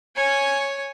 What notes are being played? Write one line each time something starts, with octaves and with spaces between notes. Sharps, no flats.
C#5 G#5